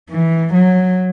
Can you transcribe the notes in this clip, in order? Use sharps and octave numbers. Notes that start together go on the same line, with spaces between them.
E3
F#3